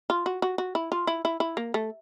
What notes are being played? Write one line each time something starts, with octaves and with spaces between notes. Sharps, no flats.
F4
F#4
F#4
F#4
E4
F4
E4
E4
E4
A#3
A3